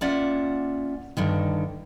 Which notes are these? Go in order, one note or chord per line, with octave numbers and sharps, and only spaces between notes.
A#3 C#4 F4 D5 E5 F#5
G2 D3 D#3